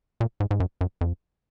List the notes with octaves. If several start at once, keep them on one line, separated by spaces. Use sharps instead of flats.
A#2
G#2
G#2
F#2
F#2
F2